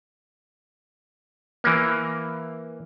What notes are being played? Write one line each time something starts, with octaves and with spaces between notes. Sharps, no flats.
E3 A#3